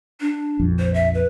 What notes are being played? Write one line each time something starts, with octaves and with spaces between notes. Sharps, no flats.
D4
A#1 F2
C5
E5
B4